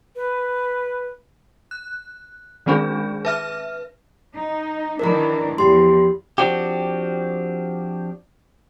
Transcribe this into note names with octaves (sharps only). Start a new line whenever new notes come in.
B4
F#6
D#3 G#3 C4 D4 G#4
B4 E5 F6
D#4
D#3 E3 D4 A#4 A#5
E2 F3 G4 C6
F3 C4 D4 F#4 G4